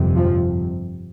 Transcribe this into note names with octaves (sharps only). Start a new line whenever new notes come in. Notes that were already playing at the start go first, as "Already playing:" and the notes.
Already playing: G1 F2 C3
F3